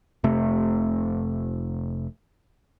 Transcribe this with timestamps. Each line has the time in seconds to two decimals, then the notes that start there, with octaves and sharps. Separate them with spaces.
0.24 F1 C3 A3